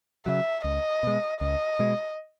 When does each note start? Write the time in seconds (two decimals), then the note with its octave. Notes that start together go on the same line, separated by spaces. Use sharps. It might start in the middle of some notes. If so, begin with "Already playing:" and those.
0.26 C#3 F#3 E5
0.64 C#2 D#5
1.03 B2 G#3
1.41 C#2 D#5
1.79 B2 G#3